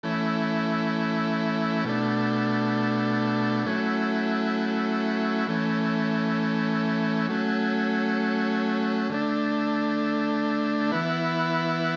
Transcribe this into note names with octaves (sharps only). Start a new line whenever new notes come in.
E3 A3 C#4 E4
B2 A3 D4
F#3 A3 C#4 E4
E3 A3 C#4
F#3 A3 C#4
D3 A3 D4
E3 B3 E4